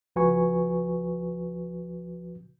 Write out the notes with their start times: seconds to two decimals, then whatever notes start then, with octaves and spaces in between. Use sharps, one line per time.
0.16 C#2 F3 F#4 B4 G#5 C#6